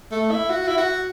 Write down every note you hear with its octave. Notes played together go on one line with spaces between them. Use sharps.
A3
E4
F#4
E4
F#4